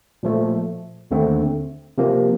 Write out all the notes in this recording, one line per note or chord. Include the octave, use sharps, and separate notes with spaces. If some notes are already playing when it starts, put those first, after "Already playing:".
A#2 F3 A3
D#2 D3 A3 C4
C3 F3 A#3